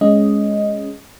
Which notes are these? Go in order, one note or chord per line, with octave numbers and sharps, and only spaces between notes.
G#3 C#4 D#5